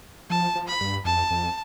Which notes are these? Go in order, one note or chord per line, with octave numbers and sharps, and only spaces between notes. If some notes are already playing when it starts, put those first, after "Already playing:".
F3 A5
F3
B5
G2
F2 A5
F2